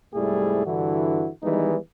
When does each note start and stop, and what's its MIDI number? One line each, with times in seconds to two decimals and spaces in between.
0.14 0.65 36
0.14 0.65 44
0.14 0.65 55
0.14 0.65 57
0.14 0.65 64
0.14 0.65 68
0.66 1.28 43
0.66 1.28 50
0.66 1.28 52
0.66 1.28 64
0.66 1.28 66
1.43 1.76 51
1.43 1.76 52
1.43 1.76 55
1.43 1.76 56
1.43 1.76 59
1.43 1.76 63